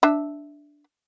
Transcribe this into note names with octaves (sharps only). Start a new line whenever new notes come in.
D4 E5